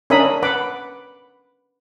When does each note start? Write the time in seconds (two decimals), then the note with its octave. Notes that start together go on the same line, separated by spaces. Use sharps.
0.10 C#4 D4 A#4 E5 B5 D#6
0.43 B4 F#5 B5 D6